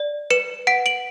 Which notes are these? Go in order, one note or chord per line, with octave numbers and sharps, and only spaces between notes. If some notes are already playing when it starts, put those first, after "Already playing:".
Already playing: D5
B4 C#7 E7
F#5 B6 D7
D7 F#7